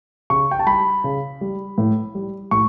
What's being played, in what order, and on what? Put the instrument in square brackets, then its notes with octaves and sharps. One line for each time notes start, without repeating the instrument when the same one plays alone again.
[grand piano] C#3 C#6
G5
A5
G3 B5
C#3
G3
A2
G3
A2 C#6